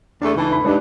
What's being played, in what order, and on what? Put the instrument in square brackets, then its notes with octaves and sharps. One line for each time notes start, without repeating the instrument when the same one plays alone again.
[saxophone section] E2 A3 [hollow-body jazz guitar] D4
[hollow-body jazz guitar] C#2 D#4 A5 [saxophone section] E3
[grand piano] B5
[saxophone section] G2 [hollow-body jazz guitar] G#3 D#4 [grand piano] D4 B4